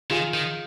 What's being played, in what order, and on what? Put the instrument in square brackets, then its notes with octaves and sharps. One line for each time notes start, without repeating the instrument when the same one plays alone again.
[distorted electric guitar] D#3 [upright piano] F4 G#4
[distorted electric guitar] D#3